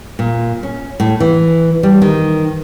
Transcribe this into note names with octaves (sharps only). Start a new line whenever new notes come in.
A#2
C#4
A2
E3
G3
D#3